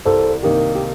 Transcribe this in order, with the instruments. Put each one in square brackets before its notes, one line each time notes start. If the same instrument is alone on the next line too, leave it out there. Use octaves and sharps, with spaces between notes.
[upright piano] C2 [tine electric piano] A4 C5
[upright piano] C3 D#3 A#3 D#4 [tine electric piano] G4 A#4
[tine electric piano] G4